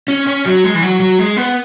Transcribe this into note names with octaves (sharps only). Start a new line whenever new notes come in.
C#4
C#4
F#3
G#3
E3
F#3
F#3
G#3
B3